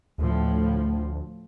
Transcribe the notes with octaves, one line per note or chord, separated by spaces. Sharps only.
D2 A2 F3